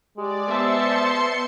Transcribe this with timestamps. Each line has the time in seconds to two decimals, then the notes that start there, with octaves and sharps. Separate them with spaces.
0.17 G#3 G4 D5
0.49 B3 C5 E5 A5 C6 C#7